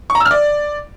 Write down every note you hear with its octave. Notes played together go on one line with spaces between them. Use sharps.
C#6
A#5
E6
F6
D5